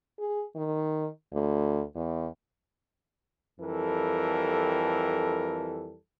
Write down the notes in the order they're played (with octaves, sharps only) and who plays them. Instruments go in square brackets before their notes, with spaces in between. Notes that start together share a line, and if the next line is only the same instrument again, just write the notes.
[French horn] G#4
D#3
D2
E2
[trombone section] F2 E3 G3 A4 A#4